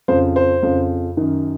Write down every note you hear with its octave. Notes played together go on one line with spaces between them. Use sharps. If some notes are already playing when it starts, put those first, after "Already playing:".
F2 C#3 C5
C5
F2 C#3
F#2 D#3